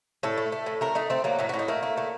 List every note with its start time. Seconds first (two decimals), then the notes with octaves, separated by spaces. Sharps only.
0.23 A2 A4
0.38 A3
0.52 A3
0.66 A2
0.81 A3 A#4
0.95 A3 D#4
1.10 A3 C4
1.24 F#3 A#3
1.39 A2 A3
1.49 A2 F#4
1.59 D#4
1.68 A3 A#3
1.83 A3
1.97 A3